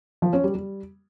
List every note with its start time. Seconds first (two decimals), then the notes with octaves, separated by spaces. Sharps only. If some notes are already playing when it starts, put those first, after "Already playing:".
0.22 F3
0.33 C#4
0.44 G3
0.55 G3